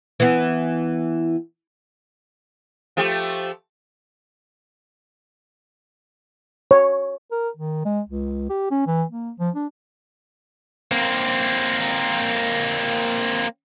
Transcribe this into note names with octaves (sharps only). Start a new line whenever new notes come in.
E3 B3
F3 A3 G4
C#5
A#4
D#3
G#3
C#2
G4
C#4
E3
A#3
F3
D4
A#3 C4